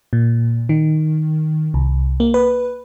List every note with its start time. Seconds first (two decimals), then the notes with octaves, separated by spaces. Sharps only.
0.13 A#2
0.69 D#3
1.74 C2
2.20 A#3
2.34 B4